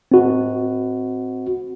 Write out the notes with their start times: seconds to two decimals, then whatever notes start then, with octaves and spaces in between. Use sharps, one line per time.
0.12 C4 F#4